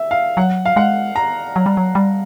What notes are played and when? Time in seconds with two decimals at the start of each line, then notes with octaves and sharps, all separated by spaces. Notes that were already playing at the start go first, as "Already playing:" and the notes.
Already playing: E5
0.11 F5
0.37 F#3 F#5
0.65 F5
0.76 G#3 F#5
1.16 A#5
1.56 F#3
1.66 G3
1.77 F#3
1.95 G3